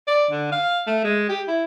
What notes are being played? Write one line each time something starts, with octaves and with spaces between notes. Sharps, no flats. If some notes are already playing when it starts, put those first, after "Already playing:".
D5
D3
F5
A3
G#3
G4
E4